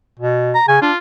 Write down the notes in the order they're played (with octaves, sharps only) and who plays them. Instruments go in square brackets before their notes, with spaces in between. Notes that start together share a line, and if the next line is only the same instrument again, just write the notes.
[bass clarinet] B2
[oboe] A#5
[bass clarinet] C#3 [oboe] G#5
[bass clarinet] D4 [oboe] F4